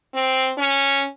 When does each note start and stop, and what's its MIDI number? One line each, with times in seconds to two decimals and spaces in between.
0.14 0.52 60
0.58 1.07 61